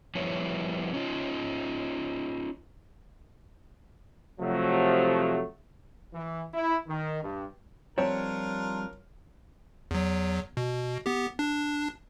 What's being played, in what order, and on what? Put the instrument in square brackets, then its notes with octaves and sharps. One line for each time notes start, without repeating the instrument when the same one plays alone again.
[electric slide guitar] F3 G3 B3 E4 C#5
C#4 D#4 F4
[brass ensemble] C3 F3 F#3 A3
[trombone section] E3
E4
D#3
G2
[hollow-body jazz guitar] F3 G3 C4 [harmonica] D4 F4 A#4 [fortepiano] C#5
[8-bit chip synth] E2 F#3
B2
B3 G4
D4